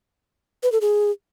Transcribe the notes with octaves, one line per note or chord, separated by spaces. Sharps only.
B4
A4
G#4